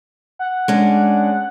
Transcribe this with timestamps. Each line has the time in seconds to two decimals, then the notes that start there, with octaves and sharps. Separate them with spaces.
0.39 F#5
0.68 G#3 C#4 D4